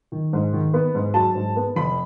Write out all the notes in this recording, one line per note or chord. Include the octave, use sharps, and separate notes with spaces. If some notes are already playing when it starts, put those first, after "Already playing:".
D#3
G#2
D#3
B3
G#2
F#3 A5
G#2
B3
F1 B5